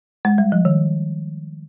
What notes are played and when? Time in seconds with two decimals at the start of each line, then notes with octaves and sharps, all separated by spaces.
0.25 G#3
0.38 G3
0.52 F3
0.65 D#3